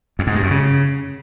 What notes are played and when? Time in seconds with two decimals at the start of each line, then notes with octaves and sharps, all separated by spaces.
0.19 F2
0.27 G#2
0.35 G2
0.43 F#2
0.51 C#3